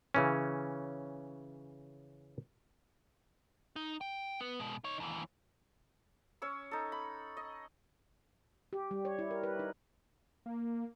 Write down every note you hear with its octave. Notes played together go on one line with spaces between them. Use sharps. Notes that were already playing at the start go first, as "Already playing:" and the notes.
C#3 E3 C#4
D#4
G5
B3
B2 G#3
D#4 C#5
D#2 E3
C#4 C#5 E6
D#4 A4
B5
D#5
G4
G3
C#5
E4
A#4
B4
D#4
A#3